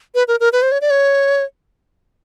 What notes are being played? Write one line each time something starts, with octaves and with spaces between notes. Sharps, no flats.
B4
A#4
A#4
B4
C5
C#5
D5
C#5